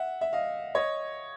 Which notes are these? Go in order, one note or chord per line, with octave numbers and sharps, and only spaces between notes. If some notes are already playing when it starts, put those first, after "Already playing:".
Already playing: E5 F#5
E5
D#5 F5
C#5 D#5